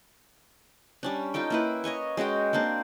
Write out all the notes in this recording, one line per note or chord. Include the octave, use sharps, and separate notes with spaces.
G3 C#4 D4
D#4 F4 A4 G5
A#3 E4 B4
C#5 D#5 G#5 C#6
G#3 C#4 F#4 G5
A#3 C4 D4 C5